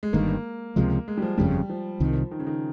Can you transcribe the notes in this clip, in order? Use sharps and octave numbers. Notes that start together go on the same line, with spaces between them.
G#3
G1 G2 D#3 A#3
C#2 C3 F3 G#3
G#3
G3
F3
G1 F2 C#3 G3
F3
C2 C3 D#3
D#3
C#3
D#3